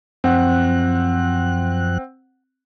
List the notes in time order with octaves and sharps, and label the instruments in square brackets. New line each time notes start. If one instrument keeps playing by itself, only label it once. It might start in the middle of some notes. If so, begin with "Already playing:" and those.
[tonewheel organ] F#2 F3 F#6 [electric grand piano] C4 F#5